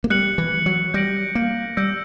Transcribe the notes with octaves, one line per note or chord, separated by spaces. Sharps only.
A#3
G3 F#6 C#7 F#7
E3
F#3
G3 G6 A#6 D7 F#7
A#3
G3 E6 G6 A#6 D7